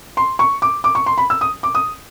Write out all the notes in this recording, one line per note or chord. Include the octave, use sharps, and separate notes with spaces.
C6
C#6
D6
D6
C#6
C6
B5
E6
D#6
D6
D#6